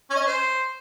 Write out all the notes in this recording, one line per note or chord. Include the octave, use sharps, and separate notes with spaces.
C#4
D#5
C#4
C5